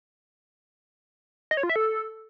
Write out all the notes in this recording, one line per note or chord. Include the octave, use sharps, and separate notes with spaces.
D#5
C#5
F4
E5
A4